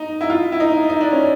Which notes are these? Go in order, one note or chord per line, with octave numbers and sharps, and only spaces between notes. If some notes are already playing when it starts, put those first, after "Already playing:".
Already playing: D#4
E4
F4
E4
D#4
D#4
D4
C#4